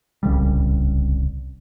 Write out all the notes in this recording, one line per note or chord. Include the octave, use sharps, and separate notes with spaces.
D1 C2 C#3 G3